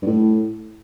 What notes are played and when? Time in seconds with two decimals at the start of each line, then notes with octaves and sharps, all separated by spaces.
0.02 G2
0.06 A2